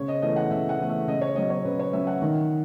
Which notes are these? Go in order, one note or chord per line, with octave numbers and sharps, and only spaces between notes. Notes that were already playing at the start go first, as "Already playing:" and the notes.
Already playing: C#3 C#5
D#5
E3 A3 D#5
F#5
C#3 E5
F#5
E3 A3
E5
C#3 D#5
C#5
F#3 C#4 D#5
C#5
C#3 B4
C#5
F#3 C#4 E5
F#5
D#3